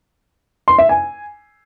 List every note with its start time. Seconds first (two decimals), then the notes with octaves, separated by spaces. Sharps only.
0.68 C6
0.78 E5
0.89 G#5